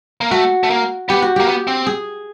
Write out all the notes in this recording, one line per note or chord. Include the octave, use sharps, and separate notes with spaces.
A#3
A3 F#4
A3
A#3
B3 G4
F#4
A#3 G4
B3
C4
G#4